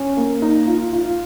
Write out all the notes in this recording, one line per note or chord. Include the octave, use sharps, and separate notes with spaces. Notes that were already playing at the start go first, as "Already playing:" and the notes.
Already playing: C#4
A#3
D#4
F4
F4